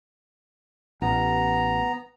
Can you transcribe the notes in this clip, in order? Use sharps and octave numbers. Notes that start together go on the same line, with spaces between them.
A1 B3 A#5